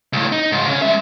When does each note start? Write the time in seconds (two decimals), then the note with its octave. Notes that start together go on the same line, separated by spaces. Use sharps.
0.13 C#2 A2
0.32 D#4
0.52 C#2 G#2
0.68 C#3 C#4
0.82 G#3 E5